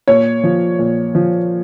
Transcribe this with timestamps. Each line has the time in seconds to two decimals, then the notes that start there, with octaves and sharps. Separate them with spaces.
0.08 A#2 C#5
0.43 F3
0.79 A#2
1.15 F3